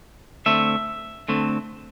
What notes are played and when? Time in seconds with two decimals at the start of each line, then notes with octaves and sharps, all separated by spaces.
0.46 D3 A3 C4 E5
1.28 D3 A3 C4